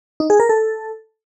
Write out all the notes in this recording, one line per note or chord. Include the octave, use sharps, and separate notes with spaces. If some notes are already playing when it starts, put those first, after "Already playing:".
D#4
G#4
A#4
A4